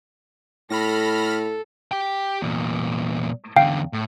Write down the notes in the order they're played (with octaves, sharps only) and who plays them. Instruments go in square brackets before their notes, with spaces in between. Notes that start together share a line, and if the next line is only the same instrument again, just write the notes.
[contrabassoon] A2 [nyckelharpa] A4 [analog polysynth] B5 F6 A#6
[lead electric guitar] G4 G5
E2 A#2
[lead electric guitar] E2 D3 [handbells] F5 G5
[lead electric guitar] A2